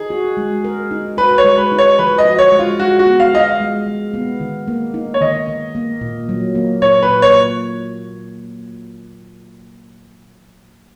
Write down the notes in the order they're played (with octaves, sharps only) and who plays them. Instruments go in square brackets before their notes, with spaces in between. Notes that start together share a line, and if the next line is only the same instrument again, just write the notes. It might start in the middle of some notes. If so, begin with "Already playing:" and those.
Already playing: [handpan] D#4 [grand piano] G#4
[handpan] F#4
G#3
A#4
D#4
[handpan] F#4 [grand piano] B4
[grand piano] C#5
[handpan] G#3
[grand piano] B4
[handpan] D#4
[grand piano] C#5
[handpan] F3 [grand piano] B4
[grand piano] D#5
[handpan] F#4
[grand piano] C#5
[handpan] G#3
[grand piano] F4
[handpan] G#3 [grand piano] F#4
[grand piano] F#4
[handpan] B3
[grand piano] F5
[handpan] F4 [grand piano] D#5
[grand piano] F5
[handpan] G#3
G#3
B3
D#3
A#3
D#4
[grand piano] C#5
[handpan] D#3 [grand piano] D#5
[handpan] D#3
A#3
A#2
F#3
A#3
[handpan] A#2 [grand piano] C#5
[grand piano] B4
[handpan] A#2
[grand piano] C#5